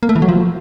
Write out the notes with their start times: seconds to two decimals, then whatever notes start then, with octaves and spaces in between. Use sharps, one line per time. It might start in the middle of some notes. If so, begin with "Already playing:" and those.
0.03 A#3
0.09 A3
0.16 E3
0.22 F#3
0.29 F3